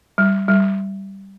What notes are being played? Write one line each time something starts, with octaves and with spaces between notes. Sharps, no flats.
G3
G3